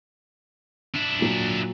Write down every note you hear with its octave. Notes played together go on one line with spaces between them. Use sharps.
D4 E4
A#2 F#3